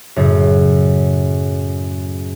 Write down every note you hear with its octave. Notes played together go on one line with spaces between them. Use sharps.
F#2 A2 C#3